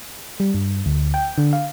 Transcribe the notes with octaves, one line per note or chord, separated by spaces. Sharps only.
G3
G2
D2
G5
D3
F5